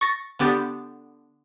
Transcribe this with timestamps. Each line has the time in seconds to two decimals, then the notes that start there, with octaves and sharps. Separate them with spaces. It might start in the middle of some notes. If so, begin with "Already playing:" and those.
0.01 C#6 A6 A#6
0.39 D3 B3 G4 A6